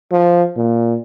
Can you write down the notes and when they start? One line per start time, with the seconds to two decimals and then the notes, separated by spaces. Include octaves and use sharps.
0.12 F3
0.57 A#2